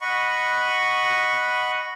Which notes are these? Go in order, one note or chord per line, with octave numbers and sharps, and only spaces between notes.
D#5 F#5 B5 C#6